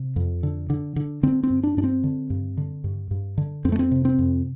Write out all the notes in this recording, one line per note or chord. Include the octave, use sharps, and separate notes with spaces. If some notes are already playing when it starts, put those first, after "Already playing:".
Already playing: C3
F2
D3
D3
D3
D3 C4
C4
G2
D4
G2 D4
C4
D3
G2
D3
G2
G2
D3
F2 C4
A3
C4
C3
C4
F2